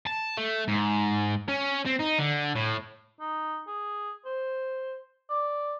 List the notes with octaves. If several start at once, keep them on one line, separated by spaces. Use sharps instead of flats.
A5
A3
G#2
C#4
C4
D#4
D3
A2
D#4
G#4
C5
D5